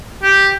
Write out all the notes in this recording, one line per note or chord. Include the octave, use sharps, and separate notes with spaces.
G4